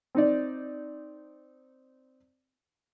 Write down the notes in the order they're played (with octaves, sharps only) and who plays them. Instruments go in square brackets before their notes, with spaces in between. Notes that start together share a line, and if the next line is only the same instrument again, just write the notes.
[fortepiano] C4 D#4 D5